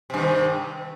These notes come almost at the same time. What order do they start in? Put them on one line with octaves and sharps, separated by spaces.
C3 G2 D#3